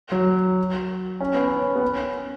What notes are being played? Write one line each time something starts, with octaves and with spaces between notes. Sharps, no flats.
F#3
C#4
B3
C#4
B3
C#4